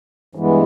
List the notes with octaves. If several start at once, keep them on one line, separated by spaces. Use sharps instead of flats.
G2 E3 G#3 B3